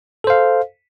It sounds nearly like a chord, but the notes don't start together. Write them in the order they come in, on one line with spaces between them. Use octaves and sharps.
A4 C5 F5